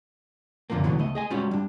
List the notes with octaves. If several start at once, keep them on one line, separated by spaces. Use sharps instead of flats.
C#2 F#2 D3 F3 A3 A#3
C#2 G2 B2 D3 E3 F#3
C#2 A3 D#5
G#4 D#5 G#5
G3 G#3 C#4 F4 F#4
G3 D4